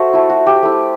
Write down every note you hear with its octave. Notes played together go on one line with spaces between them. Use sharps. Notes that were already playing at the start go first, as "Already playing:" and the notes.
Already playing: F#4 A4 C5 E5 F#5
A3 E4
F#4
G4
A3 E4